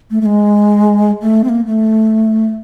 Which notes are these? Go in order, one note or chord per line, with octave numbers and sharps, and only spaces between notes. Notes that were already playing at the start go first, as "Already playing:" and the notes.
A3
A3
G#3
A3
C4
A#3
A3